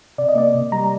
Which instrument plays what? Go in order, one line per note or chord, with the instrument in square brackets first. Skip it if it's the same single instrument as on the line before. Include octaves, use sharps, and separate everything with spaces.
[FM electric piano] C3 D5
D#5
A#3 D5
C3
G3 A#5